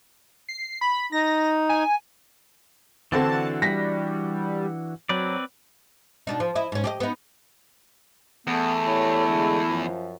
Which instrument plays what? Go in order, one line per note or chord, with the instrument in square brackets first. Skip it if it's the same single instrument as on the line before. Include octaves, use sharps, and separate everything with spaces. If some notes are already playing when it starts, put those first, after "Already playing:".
[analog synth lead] C7
B5
[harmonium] D#4 [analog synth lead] A#6
[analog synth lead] G#5
[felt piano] D3 C4 A6 [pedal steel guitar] E3 D4 F#4 [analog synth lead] A5
[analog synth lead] G3 [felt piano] A#6 B6
[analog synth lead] F#3 [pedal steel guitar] C4 B4 D5
[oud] B2 D4 D#4
F3
E4 D#5
G#2 C#4
G4 G#4 D#5
B3 D#4
[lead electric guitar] E2 [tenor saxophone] A3 [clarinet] B3
[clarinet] E4 [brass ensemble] G4 A4 C#5
[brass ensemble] D3 G#3
F#2 F3